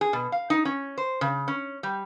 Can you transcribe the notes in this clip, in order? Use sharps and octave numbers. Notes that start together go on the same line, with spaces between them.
G#4
B2
F5
D#4
C#4
C5
C#3
C#4
G3